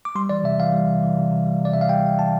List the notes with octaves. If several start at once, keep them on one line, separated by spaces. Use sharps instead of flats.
D6
G3 C6
E3 D5
C3 E5
E3 F5
G3
C3
E3
C3
C3
G3
C3
D5
C3 E5
F5
G3 G5
G3
E3 A5